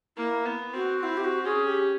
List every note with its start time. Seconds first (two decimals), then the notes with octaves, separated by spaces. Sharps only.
0.17 A#3 E4
0.46 B3
0.74 C4 F#4
1.02 C4 E4
1.17 G4
1.24 F#4
1.45 C#4 G#4
1.67 G4